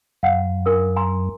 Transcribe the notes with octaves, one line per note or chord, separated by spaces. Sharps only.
F#2 F5 F#5
D4 A#4 D#6
G#5 A#5 C6